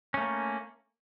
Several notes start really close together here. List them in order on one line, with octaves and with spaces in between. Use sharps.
C#4 A3 A#3